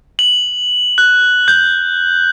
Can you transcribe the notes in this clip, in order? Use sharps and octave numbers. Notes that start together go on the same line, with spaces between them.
F#7
F#6
G6